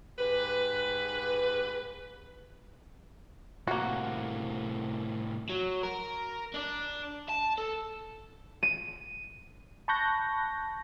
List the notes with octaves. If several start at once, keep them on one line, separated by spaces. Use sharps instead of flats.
G#2 G4 B4
A2 C3 A#3 F#4
F#3
A#4
D4 D5
A5
A4
D#7
A5 B5 C#6 F#6 G6 A#6